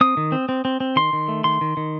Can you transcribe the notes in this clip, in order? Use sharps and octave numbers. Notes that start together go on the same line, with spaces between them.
C4 D#6
D#3
C4
C4
C4
C4
D#3 C6
D#3
A3
D#3 C6
D#3
D#3